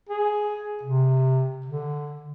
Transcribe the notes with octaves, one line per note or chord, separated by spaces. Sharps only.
G#4
C3
D3